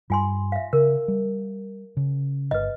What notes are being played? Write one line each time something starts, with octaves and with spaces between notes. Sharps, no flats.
G2 G3 F4 G#5 C6
E5 F5
C#3 A#4
G3
C#3
G1 B4 D#5